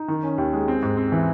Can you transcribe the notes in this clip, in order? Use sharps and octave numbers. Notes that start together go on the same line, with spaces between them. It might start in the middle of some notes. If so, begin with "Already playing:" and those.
Already playing: D#4
D#3
C#4
D#2
G#3
C4
G#2
C4
E3